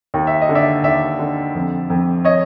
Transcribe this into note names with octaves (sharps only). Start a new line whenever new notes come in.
D#2
E5
D#5
D3
D5 E5
D#2 D5 E5
D3
F2
F2
C#5 D#5